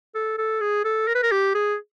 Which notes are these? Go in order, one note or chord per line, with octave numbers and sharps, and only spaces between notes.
A4
A4
G#4
A4
A#4
B4
A#4
G4
G#4